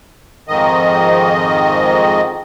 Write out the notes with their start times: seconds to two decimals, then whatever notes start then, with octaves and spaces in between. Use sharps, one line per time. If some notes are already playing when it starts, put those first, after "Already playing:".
0.48 F2 G#2 D#3 D#5